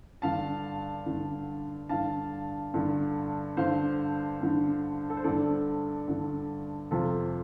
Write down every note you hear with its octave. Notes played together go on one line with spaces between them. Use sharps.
G2 D3 F5 A5
G2 D3
G2 D3 F5 A5
G2 D3
G2 D3 C5 F5
G2 D3
A4
C5
G2 D3 A4 D5
G2 D3
F2 C3 F4 A4